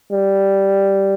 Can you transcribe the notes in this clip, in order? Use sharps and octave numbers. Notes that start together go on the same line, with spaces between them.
G3